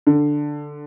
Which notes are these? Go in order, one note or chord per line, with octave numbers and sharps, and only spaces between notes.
D3